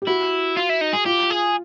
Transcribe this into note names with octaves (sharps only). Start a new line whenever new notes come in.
G4
E4 F#4
F4
E4
D#4
G#4
F4 G4
G#4